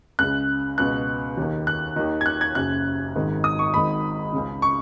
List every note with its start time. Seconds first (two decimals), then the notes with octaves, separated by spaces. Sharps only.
0.19 C#2 C#3 F#6
0.78 C#2 B2 F#6
1.37 D#2 D#3
1.67 F#6
1.96 D#2 D#3
2.21 G#6
2.26 F#6
2.41 G#6
2.55 F#1 F#2 C#3 F#6
3.16 G#1 G#2 D#3
3.44 D#6
3.59 C#6
3.74 G#1 G#2 D#3 B5
4.33 C#2 C#3
4.62 C#6